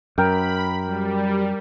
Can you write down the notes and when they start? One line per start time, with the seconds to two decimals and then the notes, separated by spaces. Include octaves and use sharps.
0.18 F#2 A#4 G5 B5
0.84 G3